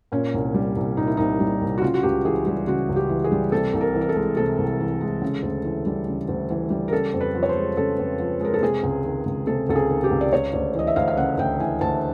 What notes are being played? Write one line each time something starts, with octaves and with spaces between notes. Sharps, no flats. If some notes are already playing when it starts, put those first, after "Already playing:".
A#2 C#4
C2
G3
C2
A#2 D#4
E4
C2 D#4
G3
C2
F#4
C#3 F4
F#4
C#2 G4
E3 G#4
G3 G4
C#3 F#4
C#2
G4
E3
G#4
G3
C3 A4
C2
A#4
E3
A#4
A4
G#3
C3 A4
C2
E3
G#3
C#3
D2
E3
G3
C#3
D2
E3
G3
A#4
C#3 A4
F2
B4
F3
C#5
C5
G#3
C#3 A4
F2
F3
G#3 A#4
A4
C3 G#4
C#2
D#3
C#2
C3 A4
C#2 A4
G#4
D#3
G4
C#2
D5
C#3 C#5
D2 D5
E3 D#5
E5
D2 F5
F5
C#3 F#5
D2 G5
E3 G#5
D2 A5